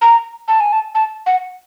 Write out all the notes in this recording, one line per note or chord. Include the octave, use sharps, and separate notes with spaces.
A#5
A5
G#5
A5
A5
F#5